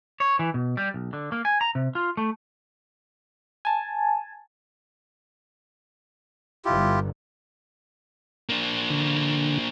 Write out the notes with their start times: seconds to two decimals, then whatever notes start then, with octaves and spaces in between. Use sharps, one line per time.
0.20 C#5
0.39 E3
0.54 B2
0.77 G3
0.94 B1
1.13 D3
1.32 A#3
1.45 G#5
1.61 A#5
1.75 C3
1.95 F4
2.17 A3
3.65 G#5 A5
6.65 G1 G2 E4 F4 G4
8.49 A#3 D4
8.90 D3